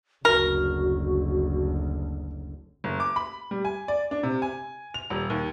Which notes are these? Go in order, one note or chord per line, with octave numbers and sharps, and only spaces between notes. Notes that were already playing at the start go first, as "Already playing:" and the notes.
F#1 D2 F#4 A#4
F#1
D6
B5
G3
G#5
D5
D4
C3
G#5
F7
D#1
D#2